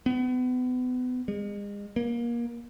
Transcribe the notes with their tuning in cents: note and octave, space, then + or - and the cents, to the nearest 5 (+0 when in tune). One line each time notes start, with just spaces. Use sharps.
B3 +30
G#3 -35
A#3 +25